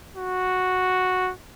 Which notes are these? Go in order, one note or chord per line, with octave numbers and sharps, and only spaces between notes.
F#4